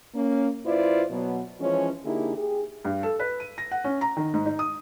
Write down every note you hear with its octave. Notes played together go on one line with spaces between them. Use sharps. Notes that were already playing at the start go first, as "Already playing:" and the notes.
A#3 C#4
F#2 E4 F4 B4 C5 D5
B2 F#3 B3
E3 F3 G#3 C#4
D3 A#3 D#4 E4 G4 G#4
G4 G#4
G2
A4
B4
D#7
A#6
F#5
C#4
A#5
D#3
G#2
D#4
D#6